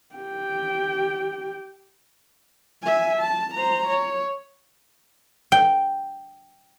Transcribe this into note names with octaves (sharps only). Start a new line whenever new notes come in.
G4 G5
E5 G#5
A5
C5 A#5
C#5
G5